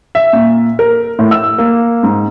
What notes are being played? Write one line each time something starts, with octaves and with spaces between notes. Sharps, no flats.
E5
A#2
A#4
A2
E6
A#3
G#2